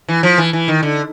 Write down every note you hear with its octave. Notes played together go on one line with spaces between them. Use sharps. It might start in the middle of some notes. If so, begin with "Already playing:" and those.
E3
F3
E3
E3
D#3
D3